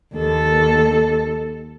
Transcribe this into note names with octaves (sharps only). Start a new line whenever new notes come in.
D#2 A4